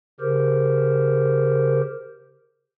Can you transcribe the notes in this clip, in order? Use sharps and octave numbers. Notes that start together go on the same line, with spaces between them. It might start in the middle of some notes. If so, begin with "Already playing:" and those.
C#3 G4 A#4 C5